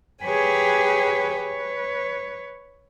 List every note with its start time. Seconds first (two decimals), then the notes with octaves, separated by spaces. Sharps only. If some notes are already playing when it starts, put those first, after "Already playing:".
0.23 G4 G#4 B4 C#5 G5 G#5
1.37 B4 C#5